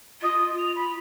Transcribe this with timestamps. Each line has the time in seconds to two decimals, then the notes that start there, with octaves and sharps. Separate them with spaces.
0.22 F4 D#5
0.58 F7
0.75 B5